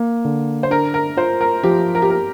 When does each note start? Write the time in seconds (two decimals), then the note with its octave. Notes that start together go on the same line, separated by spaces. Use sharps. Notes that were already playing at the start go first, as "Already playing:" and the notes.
Already playing: A#3
0.25 D3
0.63 C5
0.70 D4 A#4
0.94 A#4
1.17 F4 C5
1.41 A#4
1.63 F3 G4
1.95 A#4
2.02 G4
2.10 A#4